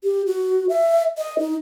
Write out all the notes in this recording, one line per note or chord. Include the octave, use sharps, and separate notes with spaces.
G4
F#4
E5
D#5
D#4